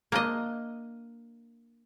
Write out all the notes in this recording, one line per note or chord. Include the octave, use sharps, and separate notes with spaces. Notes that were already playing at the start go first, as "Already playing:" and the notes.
A#3 D4 D#5